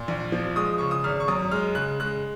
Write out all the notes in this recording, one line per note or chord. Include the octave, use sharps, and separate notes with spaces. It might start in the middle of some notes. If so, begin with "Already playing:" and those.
Already playing: A#2 C6
A#1
F3
G#3 D#6
C#3 C#6
D#6
G#1 F6
C#6
F#2 D#6
G#3 F6
C#3 F#6
G#3 F#6